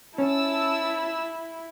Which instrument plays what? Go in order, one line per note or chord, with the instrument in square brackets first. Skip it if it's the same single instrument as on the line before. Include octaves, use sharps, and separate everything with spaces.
[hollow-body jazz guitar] C#4 [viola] E4 [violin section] A5 E6